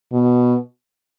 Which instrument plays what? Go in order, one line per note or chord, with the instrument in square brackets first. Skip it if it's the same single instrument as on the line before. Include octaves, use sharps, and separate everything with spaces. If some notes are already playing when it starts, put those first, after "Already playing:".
[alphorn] B2